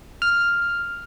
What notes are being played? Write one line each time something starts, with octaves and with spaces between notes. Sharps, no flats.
F6